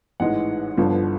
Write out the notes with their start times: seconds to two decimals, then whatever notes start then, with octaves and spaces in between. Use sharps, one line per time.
0.20 A1 G#2 E3 G#3 F#5
0.77 G1 G2 D3 F3